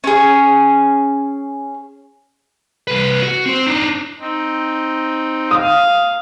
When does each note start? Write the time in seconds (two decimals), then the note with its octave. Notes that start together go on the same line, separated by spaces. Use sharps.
0.04 C#4 G#4
2.87 C2 B4
3.23 F#4
3.46 C4 C5
3.66 D4 D#4
4.20 C4 D#4
5.51 F5 D#6